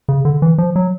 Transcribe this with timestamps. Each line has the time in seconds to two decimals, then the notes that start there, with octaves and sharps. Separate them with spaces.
0.09 C#3
0.25 D3
0.42 E3
0.58 F3
0.76 F#3